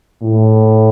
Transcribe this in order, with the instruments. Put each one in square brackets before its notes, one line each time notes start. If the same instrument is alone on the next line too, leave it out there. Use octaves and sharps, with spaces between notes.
[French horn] A2